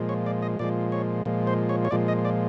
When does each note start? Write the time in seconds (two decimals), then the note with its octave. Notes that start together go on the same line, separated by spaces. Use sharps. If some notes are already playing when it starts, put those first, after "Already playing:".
Already playing: A#2 F3 G#3
0.09 C#5
0.26 D5
0.42 D#5
0.59 A#2 F3 G#3 D5
0.92 C#5
1.25 A#2 F3 G#3
1.47 C5
1.69 C#5
1.85 C#5
1.91 A#2 F3 G#3 D5
2.08 D#5
2.25 D5